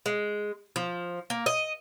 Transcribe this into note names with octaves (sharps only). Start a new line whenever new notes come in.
G#3
F3
A#3
D#5